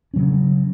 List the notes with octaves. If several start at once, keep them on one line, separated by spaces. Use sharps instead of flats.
C#3 F#3 C#4